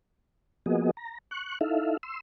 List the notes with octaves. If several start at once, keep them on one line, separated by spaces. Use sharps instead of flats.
F3 A#3 B3 F#4 G#4 D#5
A#5
C#6 F#6
D#4 E4 A4 E5 F5
C6 E6